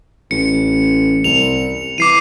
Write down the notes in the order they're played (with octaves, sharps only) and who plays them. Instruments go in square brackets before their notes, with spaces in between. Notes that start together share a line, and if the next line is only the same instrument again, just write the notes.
[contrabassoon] A1 [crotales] C#7
[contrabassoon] C2 [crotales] F7
[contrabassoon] E3 [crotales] D6 C7 D#7